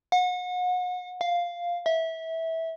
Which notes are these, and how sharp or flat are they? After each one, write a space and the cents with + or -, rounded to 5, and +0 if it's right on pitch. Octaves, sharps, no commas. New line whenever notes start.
F#5 -35
F5 +0
E5 -20